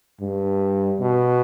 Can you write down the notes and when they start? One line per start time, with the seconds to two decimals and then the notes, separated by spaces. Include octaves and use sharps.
0.21 G2
1.00 B2